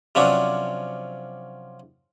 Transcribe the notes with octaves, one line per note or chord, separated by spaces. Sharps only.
C3 F3 F#3 C#4 D4